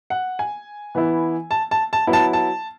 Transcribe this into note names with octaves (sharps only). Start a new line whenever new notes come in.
F#5
G#5
E3 B3 E4
A5
A5
A5
F#3 B3 E4
A5
A5